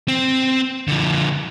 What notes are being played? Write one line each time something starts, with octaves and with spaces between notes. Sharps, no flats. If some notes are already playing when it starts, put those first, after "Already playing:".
C4
D3 F3